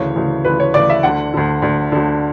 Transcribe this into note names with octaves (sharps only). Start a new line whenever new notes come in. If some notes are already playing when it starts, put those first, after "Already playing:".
Already playing: D2 C#3 E3 C#5
D2 C#3 E3
D2 C#3 E3 B4
C#5
D2 C#3 E3 D5
E5
D2 D3 F#5
D2 D3
D2 D3
D2 D3